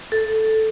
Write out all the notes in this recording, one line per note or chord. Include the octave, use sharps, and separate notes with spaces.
A4